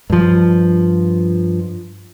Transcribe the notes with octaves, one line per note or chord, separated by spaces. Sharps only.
G2 F3